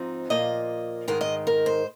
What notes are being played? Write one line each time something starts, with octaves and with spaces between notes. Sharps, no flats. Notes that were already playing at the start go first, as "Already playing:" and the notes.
Already playing: G#2 F3 C4 D#4
A#2 F3 A#3 D#5
G#2 D#3 G#3 A#4
D#5
A#4
C5